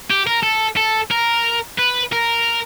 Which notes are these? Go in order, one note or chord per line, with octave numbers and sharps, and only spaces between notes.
G4
A#4
A4
A4
A#4
B4
A#4